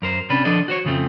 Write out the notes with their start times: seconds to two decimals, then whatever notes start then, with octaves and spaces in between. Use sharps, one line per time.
0.02 F#2 A#4 C5
0.30 C3 C#4 D4 B4
0.45 F3 D4 A4 D5 D#5
0.68 F#4 C5 C#5
0.85 F2 C#3 F3 A3 C4